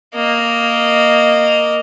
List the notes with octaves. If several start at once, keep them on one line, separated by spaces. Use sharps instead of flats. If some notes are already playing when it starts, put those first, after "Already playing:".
A#3 D#5